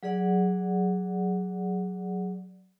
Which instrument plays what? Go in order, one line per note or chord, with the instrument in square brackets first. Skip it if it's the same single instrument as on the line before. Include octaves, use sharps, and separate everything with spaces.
[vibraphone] F#3 G#4 D5 F#5